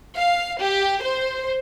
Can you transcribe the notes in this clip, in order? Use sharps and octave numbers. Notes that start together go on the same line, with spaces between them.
F5
G4
C5